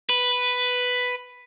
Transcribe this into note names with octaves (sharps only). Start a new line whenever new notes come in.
B4